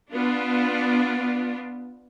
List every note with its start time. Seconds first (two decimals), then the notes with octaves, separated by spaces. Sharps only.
0.13 B3 D4 F4